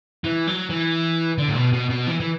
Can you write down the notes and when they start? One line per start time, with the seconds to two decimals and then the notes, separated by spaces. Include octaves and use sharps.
0.24 E3
0.47 F#3
0.69 E3
1.38 D3
1.48 A2
1.55 B2
1.73 B2
1.90 B2
2.07 E3
2.20 E3